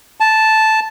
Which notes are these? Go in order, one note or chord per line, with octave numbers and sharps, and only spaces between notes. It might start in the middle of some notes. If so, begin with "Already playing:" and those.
A5